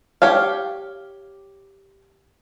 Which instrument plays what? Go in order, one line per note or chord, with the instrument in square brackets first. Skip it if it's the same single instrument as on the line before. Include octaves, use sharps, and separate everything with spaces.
[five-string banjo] G4 C#5 F5